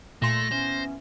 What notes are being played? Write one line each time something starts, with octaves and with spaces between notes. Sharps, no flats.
A#2 A3 C6 A#6
E3 B3 C#4 C5